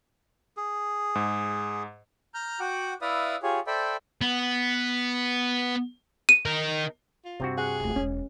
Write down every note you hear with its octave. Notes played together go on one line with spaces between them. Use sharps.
G#4
G#2
A#5 F6 G6
F#4 F#5 G5 D6
E4 B4 D5 E5 F5 D#6
F4 G4 G#4 C#5
A4 C5 D5 E5 G5 B5
B3
D#7
D#4 A#4
F4
G2 C3 C4 F#4
G#4 F#5
D#1 A3
E1 G#3 C#4